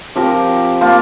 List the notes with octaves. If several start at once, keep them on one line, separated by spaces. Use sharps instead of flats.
F3 C4 G4 A#4
F3 A#3 F4 C5